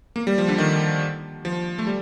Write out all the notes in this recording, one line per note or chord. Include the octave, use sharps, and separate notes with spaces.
A#3
G3
F3
D3
D#3
F3
A3
G3